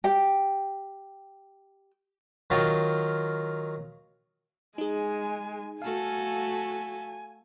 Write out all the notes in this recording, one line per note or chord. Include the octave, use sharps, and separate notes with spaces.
G4 G5
D#3 F#3 F4
G#3 D#4 G#4 G#5
A3 F#4 A4 F5 G#5